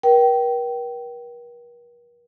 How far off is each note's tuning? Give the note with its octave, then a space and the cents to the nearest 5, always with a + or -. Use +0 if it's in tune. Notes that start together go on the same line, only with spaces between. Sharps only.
A#4 +45 G5 -20